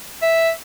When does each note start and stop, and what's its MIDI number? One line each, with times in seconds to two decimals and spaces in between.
0.22 0.50 76